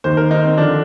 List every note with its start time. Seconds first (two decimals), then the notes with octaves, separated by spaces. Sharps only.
0.04 D#2 D#3 C5
0.17 A#4
0.31 D#4
0.45 C4
0.58 D3 F3 D4